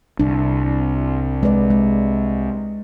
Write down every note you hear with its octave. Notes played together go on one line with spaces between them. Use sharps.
C2 D4
G#3 B4 D5
G#3